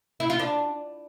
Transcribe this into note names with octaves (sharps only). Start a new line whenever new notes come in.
E4
F4
D4